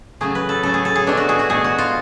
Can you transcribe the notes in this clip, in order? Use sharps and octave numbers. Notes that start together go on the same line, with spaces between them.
C#3 F#3 A3 G#4
B4
A4
C#3 F#3 A3 A4
G#4
A4
G#4
B2 A3 D4
F#4
G#4
F#4
B2 A3 G#4
F#4
F4